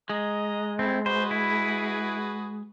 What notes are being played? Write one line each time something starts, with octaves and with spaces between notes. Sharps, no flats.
G#3 D#5 A#5 D#6
A3 C4 E4
F#4 G#4 B4 C5
E4